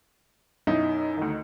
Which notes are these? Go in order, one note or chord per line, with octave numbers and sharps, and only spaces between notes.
F#2 B2 D#4 E4
D2 D#3